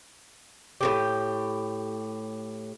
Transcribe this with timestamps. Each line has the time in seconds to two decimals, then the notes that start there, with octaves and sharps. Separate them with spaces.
0.81 A2 C3 G4